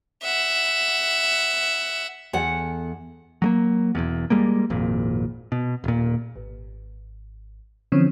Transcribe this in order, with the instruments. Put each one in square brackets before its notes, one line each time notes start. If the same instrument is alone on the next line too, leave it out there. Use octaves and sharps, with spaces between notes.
[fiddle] E5 F#5
[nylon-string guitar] E2 A4 F#5
[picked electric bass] F#3 G#3 A#3
E1 E2
G3 G#3 A#3
G#1 F2 A#2
B2
D#1 A#2
[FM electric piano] G#1
D3 E3 F3 C4 C#4